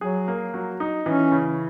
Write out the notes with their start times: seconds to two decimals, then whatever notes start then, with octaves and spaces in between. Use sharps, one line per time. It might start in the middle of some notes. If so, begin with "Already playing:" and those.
0.01 F#3 G#4
0.28 A#3
0.54 F#3
0.80 D#4
1.06 E3 C#4
1.32 C#3